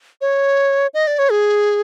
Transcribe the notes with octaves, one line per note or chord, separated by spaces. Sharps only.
C#5
D#5
D5
C#5
G#4